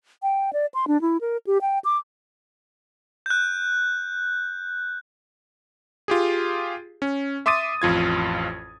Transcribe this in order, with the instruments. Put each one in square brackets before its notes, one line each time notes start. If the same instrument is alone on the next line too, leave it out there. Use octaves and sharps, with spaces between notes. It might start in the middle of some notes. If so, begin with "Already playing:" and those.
[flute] G5
D5
C6
D4
E4
A#4
G4
G5
D6
[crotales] F#6 G6
[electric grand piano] F4 G4 G#4
C#4
E5 C6 D6 D#6 A6 D#7
A1 F2 F4 G#6